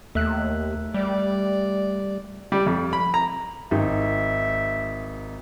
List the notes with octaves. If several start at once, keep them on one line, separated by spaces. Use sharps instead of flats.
D#2 A3 E5 F#6
G3 D5
G3
F2
B5
A#5
G#1 D#4 E5